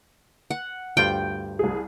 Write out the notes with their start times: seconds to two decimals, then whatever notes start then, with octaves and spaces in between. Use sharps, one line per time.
0.50 F#5
0.97 D2 G2 F4 G5
1.59 C2 G#4